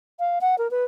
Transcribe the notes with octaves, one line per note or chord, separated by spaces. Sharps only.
F5
F#5
A#4
B4